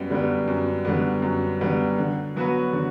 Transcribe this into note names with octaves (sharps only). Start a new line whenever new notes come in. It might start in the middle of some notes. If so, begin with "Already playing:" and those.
Already playing: F#2 G3 B3
D3 G3 B3
F#2
D3 G3 B3
F#2
D3 G3 B3
D3
F#3 B3 F#4 B4
D3